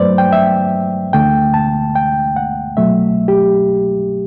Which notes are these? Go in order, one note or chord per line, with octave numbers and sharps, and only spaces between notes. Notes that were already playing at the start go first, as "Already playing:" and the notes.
Already playing: G2 F#3 A3 B4 C5 D5
G5
E5
D2 D3 A3 G5
A5
G5
F#5
C2 B2 F#3 A3 E5
G4